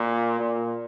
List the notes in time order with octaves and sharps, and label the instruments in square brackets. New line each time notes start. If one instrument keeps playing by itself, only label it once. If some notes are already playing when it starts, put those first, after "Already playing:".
Already playing: [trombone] A#2
A#2